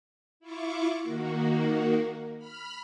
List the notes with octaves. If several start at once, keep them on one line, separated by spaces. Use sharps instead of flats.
E4 F4 C#6 D6
D#3 A#3 F#4
B5 F6